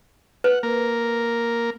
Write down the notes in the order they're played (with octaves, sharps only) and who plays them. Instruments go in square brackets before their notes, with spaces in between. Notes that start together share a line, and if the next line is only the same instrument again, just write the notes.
[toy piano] B4 [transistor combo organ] F#5
[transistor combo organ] A#3 A#4